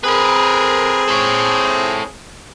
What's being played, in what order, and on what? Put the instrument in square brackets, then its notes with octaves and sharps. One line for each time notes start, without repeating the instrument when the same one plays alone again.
[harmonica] C4 G#4 [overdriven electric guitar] A#4 B4
[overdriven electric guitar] A4 C#5